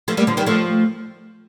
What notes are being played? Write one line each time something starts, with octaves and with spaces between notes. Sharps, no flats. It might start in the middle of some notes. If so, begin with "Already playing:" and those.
F3 A3
G3 A#3
D3 F3
D#3 G3
F3 A3